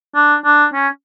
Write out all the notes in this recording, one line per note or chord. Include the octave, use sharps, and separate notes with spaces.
D4
D4
C#4